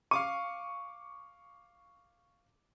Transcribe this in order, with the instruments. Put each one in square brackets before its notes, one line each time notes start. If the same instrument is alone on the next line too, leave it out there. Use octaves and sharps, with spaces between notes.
[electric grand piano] F5 D6 D#7 [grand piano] C#6